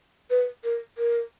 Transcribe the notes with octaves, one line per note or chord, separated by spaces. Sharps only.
B4
A#4
A#4